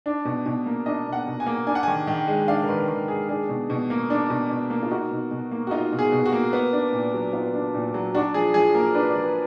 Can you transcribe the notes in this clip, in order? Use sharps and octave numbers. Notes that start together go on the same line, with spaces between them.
D4
B2
B2
A#3
D4 D#5
B2
F#5
B2
G#5
A#3
D4 G#5
F#5
D#3 G#5
D#3
G#3
D4 F5
A#4
D#3 B4
D#3 A#4
G#3 G#4
D4 G#4
B2
B2
A#3
D4
B2
B2
A#3
F4
D#4 F#4
B2
B2
A#3
F#4
D#4 F4
B2
G#4
B2
F#4
A#3
B3
D4
A#2
F#3
B3 F4
D4
A#2
F#3
D4 F#4
F3 G#4
F3 G#4
A#3 A#4
D4 B4
D5
F3
B4